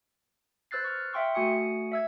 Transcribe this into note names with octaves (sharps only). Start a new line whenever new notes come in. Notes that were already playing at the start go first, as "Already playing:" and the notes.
B4 C5 E6 F#6 A6 C7
C#6 F6
E5 F5 G5 C6 C#6 E6
A3 F#4 G#5 D#6 C#7
E5 E6 G#6